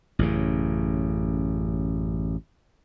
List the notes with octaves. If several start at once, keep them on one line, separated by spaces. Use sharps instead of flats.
A1 F#2 C#3